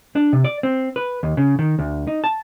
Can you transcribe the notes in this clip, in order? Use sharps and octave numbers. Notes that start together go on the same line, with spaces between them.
D4
C3
D5
C4
B4
D#2
C#3
D#3
D2
D#4
A5